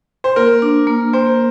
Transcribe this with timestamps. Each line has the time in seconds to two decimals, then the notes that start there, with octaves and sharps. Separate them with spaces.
0.24 C5
0.36 A#3 A#4
0.62 D4
0.87 A#3
1.13 A#3 C5